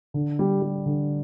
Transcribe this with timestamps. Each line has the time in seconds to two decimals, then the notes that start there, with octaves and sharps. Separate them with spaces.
0.14 D3
0.39 G3
0.62 G3
0.86 D3